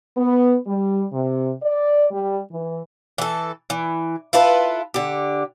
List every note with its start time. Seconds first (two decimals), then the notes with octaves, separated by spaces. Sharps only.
0.17 B3
0.67 G3
1.12 C3
1.63 D5
2.11 G3
2.51 E3
3.18 E3 A4
3.70 E3
4.33 E4 F4 A4 B4
4.94 D3 G4